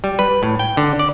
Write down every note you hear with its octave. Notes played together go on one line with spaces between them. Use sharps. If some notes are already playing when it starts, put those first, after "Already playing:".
G3
B4
A2
G5
D3
D5